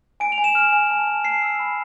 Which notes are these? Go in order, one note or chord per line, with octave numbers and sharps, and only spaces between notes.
G#5 D7
F7
G#5
E7
F6 E7
G#5
A5
A5
A5 C7
E6
B5